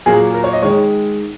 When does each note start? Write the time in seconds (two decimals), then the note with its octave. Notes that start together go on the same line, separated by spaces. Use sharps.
0.06 A#2 F#3 A#3 G#4
0.34 A#4
0.44 C#5
0.53 D#5
0.62 D#3 G#3 C#5